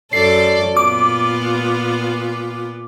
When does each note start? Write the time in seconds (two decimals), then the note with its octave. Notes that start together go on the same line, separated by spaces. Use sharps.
0.13 F#2 A4 D5 C7
0.77 A#2 B3 F4 D6